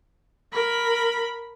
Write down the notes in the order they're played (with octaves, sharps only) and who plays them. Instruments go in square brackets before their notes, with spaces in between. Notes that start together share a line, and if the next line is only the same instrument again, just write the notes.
[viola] A#4 B5